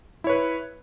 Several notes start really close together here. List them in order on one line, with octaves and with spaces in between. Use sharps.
E4 C#5 B4